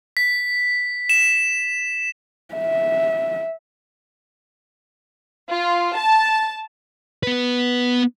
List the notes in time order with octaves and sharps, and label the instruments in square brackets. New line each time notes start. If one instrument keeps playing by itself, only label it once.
[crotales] B6
E7
[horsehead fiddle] E5
[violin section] F4
A5
[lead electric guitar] B3 B4